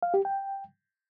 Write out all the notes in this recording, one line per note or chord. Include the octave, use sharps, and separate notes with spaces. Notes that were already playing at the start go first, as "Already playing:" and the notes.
F5
G4
G5